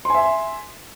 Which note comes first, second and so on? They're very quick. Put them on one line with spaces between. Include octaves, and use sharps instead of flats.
C6 G#5 E5